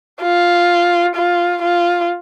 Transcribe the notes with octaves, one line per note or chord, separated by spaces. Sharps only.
F4
F4
F4